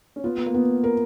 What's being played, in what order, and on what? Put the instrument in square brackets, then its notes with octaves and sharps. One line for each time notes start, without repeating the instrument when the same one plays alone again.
[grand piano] C#4
[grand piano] B3 [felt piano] F4
[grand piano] B3
A#3
[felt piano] B3
A#4